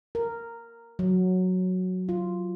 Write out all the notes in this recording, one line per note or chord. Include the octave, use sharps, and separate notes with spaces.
A#4
F#3
F4